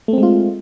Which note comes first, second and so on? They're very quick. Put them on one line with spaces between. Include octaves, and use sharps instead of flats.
A3 C4 G#3 F4